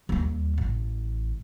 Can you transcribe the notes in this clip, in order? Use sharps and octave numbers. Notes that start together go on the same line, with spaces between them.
D#2 G3
A1